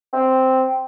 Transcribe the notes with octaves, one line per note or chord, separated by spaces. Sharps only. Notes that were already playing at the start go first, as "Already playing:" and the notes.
C4